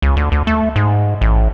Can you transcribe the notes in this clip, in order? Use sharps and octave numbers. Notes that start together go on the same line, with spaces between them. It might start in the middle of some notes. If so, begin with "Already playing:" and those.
C#2
D2
D2
A3
G#2
A1